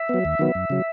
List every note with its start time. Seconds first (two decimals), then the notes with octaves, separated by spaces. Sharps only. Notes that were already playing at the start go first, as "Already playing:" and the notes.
Already playing: E5
0.09 F#3 B3
0.25 D#2
0.39 D#3 F#3 B3
0.55 F#2
0.70 C#3 F#3